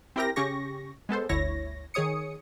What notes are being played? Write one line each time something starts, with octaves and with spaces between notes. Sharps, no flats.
C4 E4 G4 A#4 G5 A#6
C#3 C#4 G4 C#6 A#6
G#3 B3 A4 C5
G1 D2 E4 C#5 A#6
D#3 G#4 C#5 D#6 C#7